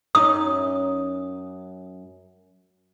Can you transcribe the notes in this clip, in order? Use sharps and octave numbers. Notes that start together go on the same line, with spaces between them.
F#2 C#4 D#4 D#6